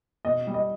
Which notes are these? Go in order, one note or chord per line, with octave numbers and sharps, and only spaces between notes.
B2 D#5
G3
D#5